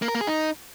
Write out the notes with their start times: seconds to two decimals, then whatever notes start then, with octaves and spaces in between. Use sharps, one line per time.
0.02 A#3
0.08 A#4
0.15 A#3
0.21 G#4
0.27 D#4